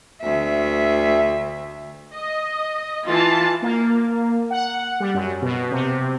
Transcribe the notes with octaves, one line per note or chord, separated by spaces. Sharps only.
D2 E5
D#5
E3 F4 A5
A#3
F#5
G3
F#2
B2
C3